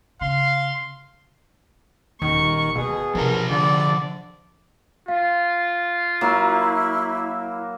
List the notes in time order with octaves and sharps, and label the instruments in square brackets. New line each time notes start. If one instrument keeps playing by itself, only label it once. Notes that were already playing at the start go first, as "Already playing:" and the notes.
[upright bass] C#3 [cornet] F5 [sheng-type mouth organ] C6
[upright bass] D#1 [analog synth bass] D#3 [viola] C#6
[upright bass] D2 [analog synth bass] B2 [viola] G#4
[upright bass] C3 B3 [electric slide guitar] F3 D4 A5 [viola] A#4
[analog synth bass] D3 [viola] D5
[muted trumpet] F4 [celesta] F5
[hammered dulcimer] F#3 A#3 [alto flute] E4